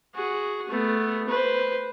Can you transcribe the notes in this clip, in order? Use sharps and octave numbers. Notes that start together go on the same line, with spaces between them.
F#4 G#4
A3 B3
B4 C5